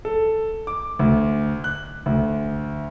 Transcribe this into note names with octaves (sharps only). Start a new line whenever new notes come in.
A4
D6
D2
F#6
D2